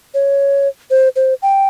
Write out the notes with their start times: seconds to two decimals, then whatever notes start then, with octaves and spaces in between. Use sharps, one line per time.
0.14 C#5
0.91 C5
1.16 C5
1.42 G5